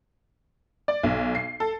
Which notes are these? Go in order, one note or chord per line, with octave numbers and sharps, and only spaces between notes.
D5
B1
C7
A4